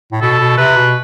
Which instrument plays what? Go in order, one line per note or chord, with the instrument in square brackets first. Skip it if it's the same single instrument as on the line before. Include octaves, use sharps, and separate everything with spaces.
[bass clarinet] A2
[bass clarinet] B2 [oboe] A4
[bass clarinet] B2
[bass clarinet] C3 [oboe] B4
[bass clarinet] B2